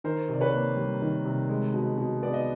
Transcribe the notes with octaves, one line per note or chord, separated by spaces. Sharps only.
D#3 A#4 C5
C3 D5
B4 C#5
A#3
G3
D#3
C3
G#3
B2
B2
B3 D5
D#5